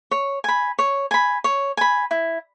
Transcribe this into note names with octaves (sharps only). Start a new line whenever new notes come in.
C#5
G#5 B5
C#5
G#5 B5
C#5
G#5 B5
E4